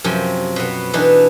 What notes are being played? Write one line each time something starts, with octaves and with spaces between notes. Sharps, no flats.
F#2 C3 F3
B2 B3
E3 B3 D4 D#4